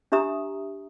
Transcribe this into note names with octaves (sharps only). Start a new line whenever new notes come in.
D4 G4 E5 A#5 D#6